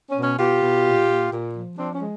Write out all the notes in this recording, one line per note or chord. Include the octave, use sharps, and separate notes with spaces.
C#4
B2
C#4
B2 F4 G4
B2
A#2
A#2
A#2
F3
F3 C4 D4
C#4
G#3